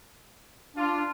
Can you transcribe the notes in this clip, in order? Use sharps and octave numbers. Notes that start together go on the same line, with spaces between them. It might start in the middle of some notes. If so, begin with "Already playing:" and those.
D4 F4